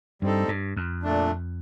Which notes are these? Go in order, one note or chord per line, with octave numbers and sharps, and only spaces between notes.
G2 G3 C4 D#4 A4
G2
F2
A#2 A3 D4